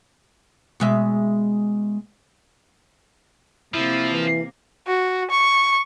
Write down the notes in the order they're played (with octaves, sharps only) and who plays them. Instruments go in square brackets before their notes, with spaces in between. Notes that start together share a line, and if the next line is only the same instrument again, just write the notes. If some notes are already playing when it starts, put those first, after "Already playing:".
[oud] B2 G#3 E5
[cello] C3 A#3 [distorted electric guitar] F3 [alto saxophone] E4
[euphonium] E3
[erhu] F#4
C#6